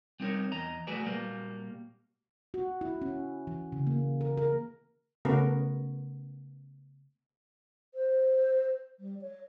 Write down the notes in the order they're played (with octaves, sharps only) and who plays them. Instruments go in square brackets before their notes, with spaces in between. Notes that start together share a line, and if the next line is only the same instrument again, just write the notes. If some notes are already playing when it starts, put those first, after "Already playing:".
[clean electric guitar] G3 C4 D#4 G#4 A#4 C#5
E2 D#5 A#5
F#3 A3 F#4 G#4 B4 D5
A#2 F#3 G3 A#3
[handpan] F#4
E4
C#4
E3
C#3
A#3
A#4
A#4
[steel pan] C#3 A3 B3 F#4 A#4
[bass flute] C5
G3
C#5